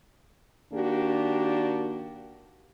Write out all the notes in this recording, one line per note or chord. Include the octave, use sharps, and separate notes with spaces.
D#3 A#3 D4 F#4 G4